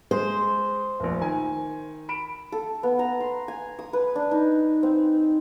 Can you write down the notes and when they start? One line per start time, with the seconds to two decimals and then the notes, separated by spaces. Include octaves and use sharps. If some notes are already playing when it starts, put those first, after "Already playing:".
0.11 G#3 C5
1.00 F1 A#1
1.21 D#3 G#5
2.09 B5 D7 E7
2.52 A4
2.83 B3
2.99 A#5
3.20 C6
3.48 G#5
3.79 D#6
3.93 B4
4.16 D4
4.31 D#4
4.83 C4